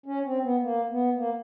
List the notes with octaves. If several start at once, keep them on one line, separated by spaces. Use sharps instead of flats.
C#4
C4
B3
A#3
B3
A#3